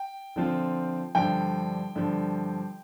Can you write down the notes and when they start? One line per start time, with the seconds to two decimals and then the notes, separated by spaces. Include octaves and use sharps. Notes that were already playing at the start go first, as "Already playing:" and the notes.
Already playing: G5
0.36 D3 F3 C4 F4
1.15 G2 D3 F3 G5
1.95 G2 D3 F3